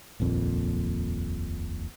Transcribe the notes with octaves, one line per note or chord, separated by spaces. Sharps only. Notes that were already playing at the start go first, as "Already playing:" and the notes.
D#1 A#1 F2 A#2